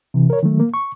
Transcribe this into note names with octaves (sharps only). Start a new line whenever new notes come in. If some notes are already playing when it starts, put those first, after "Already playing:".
C3 E3
A#4 C#5
D#3 F#3 A3
A#3
C#6